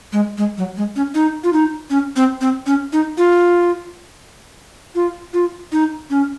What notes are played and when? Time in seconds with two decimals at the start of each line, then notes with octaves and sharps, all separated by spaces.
0.13 G#3
0.38 G#3
0.58 F#3
0.77 G#3
0.96 C#4
1.15 D#4
1.44 F4
1.53 D#4
1.90 C#4
2.16 C4
2.41 C4
2.66 C#4
2.93 D#4
3.18 F4
4.95 F4
5.34 F4
5.72 D#4
6.10 C#4